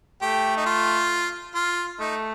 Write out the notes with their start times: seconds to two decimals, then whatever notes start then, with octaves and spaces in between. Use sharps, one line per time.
0.22 A3 G4
0.57 D#4
0.66 F4
1.55 F4
1.99 A3 D#4